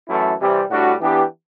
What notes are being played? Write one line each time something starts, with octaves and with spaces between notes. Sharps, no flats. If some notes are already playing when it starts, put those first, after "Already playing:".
F#2 E3 A3 E4 A4
C3 E3 G3 C4
A2 G3 D4 F#4
E3 B3 D4 G4